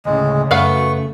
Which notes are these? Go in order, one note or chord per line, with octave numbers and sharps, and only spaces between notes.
D2 A2 C#3 G#3
F#2 C#3 A3 B3 F5 C#6